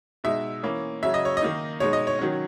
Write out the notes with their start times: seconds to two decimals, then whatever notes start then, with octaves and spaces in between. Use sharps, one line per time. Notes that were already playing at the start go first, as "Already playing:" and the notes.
0.24 B2 G#3 D#4 E5
0.63 E3 A#3 C#4
1.03 C#3 F#3 C#4 E5
1.14 D#5
1.25 C#5
1.37 D#5
1.42 D#3 A#3 D#4
1.80 B2 G#3 D#4 C#5
1.93 D#5
2.07 C#5
2.19 D#3 F#3 C#4